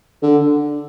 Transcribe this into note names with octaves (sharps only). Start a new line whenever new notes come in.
D3